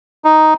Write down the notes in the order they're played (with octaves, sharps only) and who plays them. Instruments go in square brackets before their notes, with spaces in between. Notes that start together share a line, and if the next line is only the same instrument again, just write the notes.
[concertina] D#4